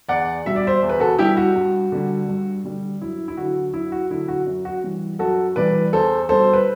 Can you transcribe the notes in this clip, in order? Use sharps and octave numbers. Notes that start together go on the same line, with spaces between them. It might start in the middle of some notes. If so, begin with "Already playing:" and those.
E2 D5 F#5
B2 G3 E5
D5
C5 E5
E2
B4
F#4 A4
B2 G3 E4 G4
F#4
G2
D3 G3
G2
D3 G3
F#2 E4
E4
D3 F#3 F#4
F#2 E4
F#4
D3 F#3 E4
F#4
F#2
F#4
E3 G3
F#2 F#4 A4
E3 G3 B4 D5
E2 A4 C5
B2 G3 A4 C5
B4